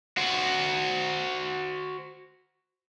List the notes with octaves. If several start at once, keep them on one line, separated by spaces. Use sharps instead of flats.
F#4 C5